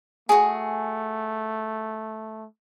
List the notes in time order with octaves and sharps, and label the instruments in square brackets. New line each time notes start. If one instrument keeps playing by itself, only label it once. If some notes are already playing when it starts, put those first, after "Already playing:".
[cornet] A3 [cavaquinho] F#4 G#4 [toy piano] G#5